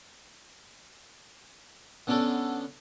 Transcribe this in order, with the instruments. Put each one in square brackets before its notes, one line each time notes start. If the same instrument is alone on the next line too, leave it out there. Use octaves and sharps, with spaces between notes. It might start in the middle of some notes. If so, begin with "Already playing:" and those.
[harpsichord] D3 B3 C#4 D4 A4